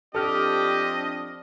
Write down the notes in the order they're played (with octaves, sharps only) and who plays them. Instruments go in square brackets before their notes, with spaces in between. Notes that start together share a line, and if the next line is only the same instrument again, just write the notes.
[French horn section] F3 C4 D4 [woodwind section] G4 [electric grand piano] A4 F6 [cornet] D#5